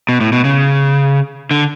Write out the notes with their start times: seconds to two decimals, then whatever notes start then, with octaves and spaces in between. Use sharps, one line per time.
0.09 B2
0.20 A2
0.32 B2
0.44 C#3
1.51 D3